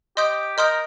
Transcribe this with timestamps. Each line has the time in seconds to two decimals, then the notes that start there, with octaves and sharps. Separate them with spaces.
0.17 G4 D#5 C6 D#6 G6
0.58 A#4 D#5 C6 D#6 G6